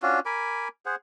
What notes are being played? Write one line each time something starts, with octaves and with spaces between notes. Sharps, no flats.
C#4 D4 F4 F#4
A#4 G#5 B5 D6
G#4 C5 F#5